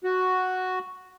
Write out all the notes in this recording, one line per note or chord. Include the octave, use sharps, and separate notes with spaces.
F#4